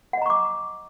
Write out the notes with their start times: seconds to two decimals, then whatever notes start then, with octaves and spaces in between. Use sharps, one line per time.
0.13 F#5
0.17 D#5
0.22 A#5
0.26 C#6
0.30 D6